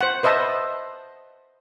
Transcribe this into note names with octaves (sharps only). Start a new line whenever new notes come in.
C5 F#5
B4 C5 D#5 E5 A5